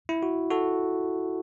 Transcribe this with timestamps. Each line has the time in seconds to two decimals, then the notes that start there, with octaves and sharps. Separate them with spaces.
0.09 E4
0.23 F#4
0.50 F#4 A4